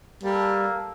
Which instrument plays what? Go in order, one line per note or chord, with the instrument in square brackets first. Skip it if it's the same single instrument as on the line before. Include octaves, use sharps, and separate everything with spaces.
[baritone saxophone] G3 [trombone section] A#3 A4